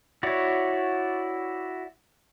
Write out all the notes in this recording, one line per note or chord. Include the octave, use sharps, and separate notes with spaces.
E4 F#4 C#5 D5